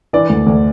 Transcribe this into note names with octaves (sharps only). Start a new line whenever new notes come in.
E3 D4 D5
D2
D2